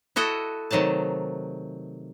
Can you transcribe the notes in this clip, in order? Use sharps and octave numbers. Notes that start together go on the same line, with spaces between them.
E4 F#4 A4 D#5
C3 D#3 F#3 A3 A5